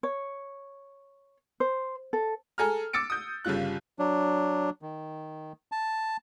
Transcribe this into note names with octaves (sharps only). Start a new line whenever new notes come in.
C#5
C5
A4
G#4 A4 G#5 A#5 F6
D6 E6 A6 C#7 D7
D#6 G6
G1 C#3 G3 F4 F#6
F#3 D4
D#3
A5